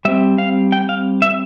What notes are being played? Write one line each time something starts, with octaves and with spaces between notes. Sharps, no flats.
G3 C4 E5
F5
G5
F5
E5